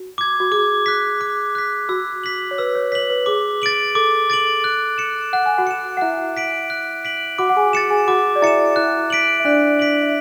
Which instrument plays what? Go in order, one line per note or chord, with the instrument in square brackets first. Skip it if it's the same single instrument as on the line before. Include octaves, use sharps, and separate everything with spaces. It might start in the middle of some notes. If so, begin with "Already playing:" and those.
Already playing: [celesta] F#4
[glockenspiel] D6 G#6
[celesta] F#4
[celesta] G#4 [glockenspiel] D6
[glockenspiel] F#6 B6
D6
F#6 B6
[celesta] F#4 [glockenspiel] E6
[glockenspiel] B6 F#7
[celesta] C#5
[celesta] B4 [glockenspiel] E6
[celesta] C#5
[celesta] C#5 [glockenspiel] B6 F#7
[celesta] B4
[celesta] G#4 [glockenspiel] D6
[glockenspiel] A6 D7 F#7
[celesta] A4 [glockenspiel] D6
[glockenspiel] A6 D7 F#7
F#6
C#7 E7
[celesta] F#5 [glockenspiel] F#6
[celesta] G#5
F#4 F#5
[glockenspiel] C#7 E7
[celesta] F#5
[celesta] E4 E5 [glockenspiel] F#6
[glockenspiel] B6 D7 F#7
F#6
B6 D7 F#7
[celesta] F#4 F#5 [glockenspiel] D6
[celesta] F#5
G#4 G#5
[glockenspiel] A6 C#7 E7
[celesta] G#4 G#5
[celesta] F#4 F#5 [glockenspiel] D6
[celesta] D5
[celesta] E4 E5 [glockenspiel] A6 C#7 E7
[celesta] E4 E5 [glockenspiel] F#6
[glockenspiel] B6 D7 F#7
[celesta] E5
[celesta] D4 D5 [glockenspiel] F#6
[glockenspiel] B6 D7 F#7
[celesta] E5